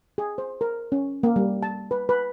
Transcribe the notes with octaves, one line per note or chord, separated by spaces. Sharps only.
G#4
C5
A#4
C#4
A#3
G3
A5
B4
B4